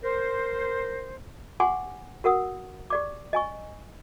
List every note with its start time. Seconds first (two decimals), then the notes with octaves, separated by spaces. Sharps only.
0.03 A#4 C5
1.60 G4 F#5 G#5 C6 D6
2.24 F#4 A#4 F#5 D#6
2.90 G4 D5 D6
3.33 D#5 G#5 C#6